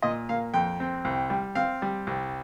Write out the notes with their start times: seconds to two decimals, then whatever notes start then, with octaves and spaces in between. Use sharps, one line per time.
0.02 A#2 D#5
0.29 A#3 F5
0.54 F2 G5
0.80 C4
1.05 C2
1.30 G3
1.55 C4 F5
1.82 G3
2.07 C2